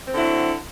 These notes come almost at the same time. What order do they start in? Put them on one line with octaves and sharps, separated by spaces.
C4 D3 E4 F#3